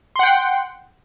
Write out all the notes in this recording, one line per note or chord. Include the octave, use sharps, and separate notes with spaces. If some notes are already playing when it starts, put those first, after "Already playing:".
F#5 G5 C6